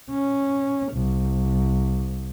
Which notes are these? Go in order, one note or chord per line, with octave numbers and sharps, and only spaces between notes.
C#4
C2